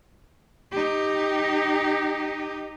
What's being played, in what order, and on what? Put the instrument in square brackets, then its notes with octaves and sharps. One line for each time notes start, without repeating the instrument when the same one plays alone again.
[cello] D#4 G4